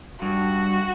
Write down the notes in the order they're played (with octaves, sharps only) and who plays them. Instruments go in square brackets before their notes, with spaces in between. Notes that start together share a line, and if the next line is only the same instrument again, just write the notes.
[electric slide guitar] G2 [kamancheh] F#4